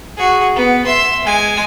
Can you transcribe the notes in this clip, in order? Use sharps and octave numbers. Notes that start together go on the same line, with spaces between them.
F#4 G#4
B3
E5 C6
G#3 G#5